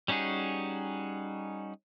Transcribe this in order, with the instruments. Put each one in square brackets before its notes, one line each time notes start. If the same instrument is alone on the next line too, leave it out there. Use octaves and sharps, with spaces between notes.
[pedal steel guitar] G3 C#4 D#4 F#4 G#4